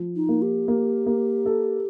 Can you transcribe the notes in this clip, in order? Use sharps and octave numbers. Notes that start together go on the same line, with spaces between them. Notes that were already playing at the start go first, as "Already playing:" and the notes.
Already playing: F3
D#4
A#3
G4
A#3
A#3
A4